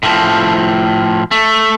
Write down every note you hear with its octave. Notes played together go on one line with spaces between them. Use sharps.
A2 F3
A3